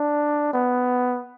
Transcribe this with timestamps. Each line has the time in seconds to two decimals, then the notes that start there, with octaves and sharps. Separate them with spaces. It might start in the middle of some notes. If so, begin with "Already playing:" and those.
Already playing: D4
0.53 B3